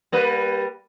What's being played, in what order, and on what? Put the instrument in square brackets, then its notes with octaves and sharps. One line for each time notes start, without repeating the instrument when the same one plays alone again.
[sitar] G3 A#3 B4